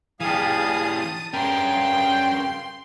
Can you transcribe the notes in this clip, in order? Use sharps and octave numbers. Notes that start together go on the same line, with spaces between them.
E3 G3 G4 G#4 F5 A5 D#6
G2 C#3 C#4 A#4 G5 C6